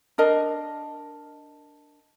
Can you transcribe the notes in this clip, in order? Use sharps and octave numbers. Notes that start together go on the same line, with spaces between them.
D4 A#4 D#5